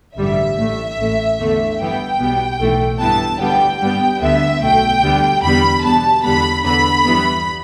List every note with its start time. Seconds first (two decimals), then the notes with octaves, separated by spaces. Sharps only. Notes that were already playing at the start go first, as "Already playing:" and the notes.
0.17 A1 G2 D3 G3 E5
0.57 A1 A2 A3
0.98 A1 A2 A3
1.38 E2 D3 A3
1.78 G2 E3 B3 G5
2.19 B1 B2 G3 B3
2.59 B1 A2 E3 A3
3.00 G2 E3 B3 A5
3.40 D2 D3 G3 B3 G5
3.81 G2 G3 B3
4.21 D2 D3 B3 E5
4.62 B1 B2 A3 G5
5.02 D2 D3 G3 B3
5.42 E2 D3 G3 B3 B5
5.83 E2 B2 G3 B3 A5
6.24 E2 D3 G3 B3 B5
6.64 E2 D3 B3 B5
7.05 G2 E3 G3 B3